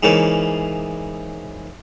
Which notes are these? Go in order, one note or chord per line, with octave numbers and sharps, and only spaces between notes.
G#2 C#3 E3 A#3 B3